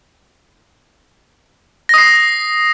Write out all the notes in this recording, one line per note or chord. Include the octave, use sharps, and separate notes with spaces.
D#6 A#6 C7